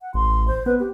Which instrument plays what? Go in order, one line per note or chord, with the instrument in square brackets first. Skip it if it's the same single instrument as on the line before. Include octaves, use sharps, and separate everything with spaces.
[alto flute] F#5
[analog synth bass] A1 [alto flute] C6
[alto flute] C5
[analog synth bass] B3 [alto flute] B4
[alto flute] G4